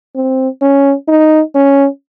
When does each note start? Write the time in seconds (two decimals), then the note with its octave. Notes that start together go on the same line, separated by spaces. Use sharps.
0.16 C4
0.62 C#4
1.09 D#4
1.55 C#4